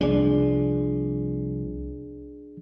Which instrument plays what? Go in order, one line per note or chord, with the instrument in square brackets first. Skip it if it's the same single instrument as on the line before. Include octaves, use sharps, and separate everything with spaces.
[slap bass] C2 F3 [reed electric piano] D4 G#4 D5